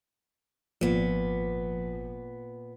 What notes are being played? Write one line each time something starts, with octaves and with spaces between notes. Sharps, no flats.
G#1 A#2 F3 B3